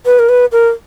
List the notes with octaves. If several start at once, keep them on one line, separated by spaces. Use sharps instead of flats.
B4
A#4
B4
A#4